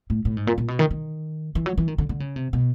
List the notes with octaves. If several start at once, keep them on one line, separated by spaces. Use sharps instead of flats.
A2
A2
G#2
A#2
A#2
B2
D#3
D#3
E3
F#3
E3
D#3
D3
D3
C#3
C3
B2